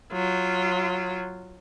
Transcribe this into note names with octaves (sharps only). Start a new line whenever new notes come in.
F#3 F4